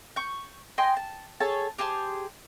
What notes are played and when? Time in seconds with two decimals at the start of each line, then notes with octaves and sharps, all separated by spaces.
0.16 C#6 G6
0.78 D#5 G5 G#5 C6
0.97 A5
1.40 G#4 A4 C#5 A5
1.78 G4 G#4 C5 A5